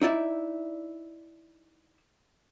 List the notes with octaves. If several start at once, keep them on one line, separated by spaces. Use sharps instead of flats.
D#4 E4 D5 E5